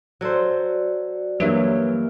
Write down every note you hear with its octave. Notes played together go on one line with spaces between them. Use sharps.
F#3 F#4 A4 C5 D5
G2 E3 F#3 A#3 C#4 A#4